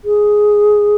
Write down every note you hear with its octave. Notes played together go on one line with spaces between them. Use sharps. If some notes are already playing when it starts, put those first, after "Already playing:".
G#4